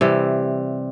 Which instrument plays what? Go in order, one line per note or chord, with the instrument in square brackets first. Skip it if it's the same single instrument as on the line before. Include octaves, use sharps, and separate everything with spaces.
[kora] C3 E3 G3